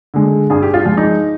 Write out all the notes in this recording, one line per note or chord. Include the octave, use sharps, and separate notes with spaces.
D3 G#3
G2 G#4
G4
F4
F3 G#3
D#4